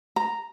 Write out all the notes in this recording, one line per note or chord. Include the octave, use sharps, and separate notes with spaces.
A#5